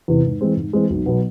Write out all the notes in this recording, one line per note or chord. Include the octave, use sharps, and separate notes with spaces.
E2 C3 E3
G#2
E3 G#3 C4
G#2
E3 G#3 C4
B1
B2 F#3 B3